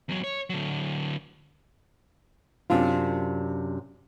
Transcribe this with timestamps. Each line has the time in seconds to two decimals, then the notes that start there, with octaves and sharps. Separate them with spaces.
0.09 E2 F#3
0.24 C#5
0.50 D3 F#3
2.70 F#2 C3 D4 F4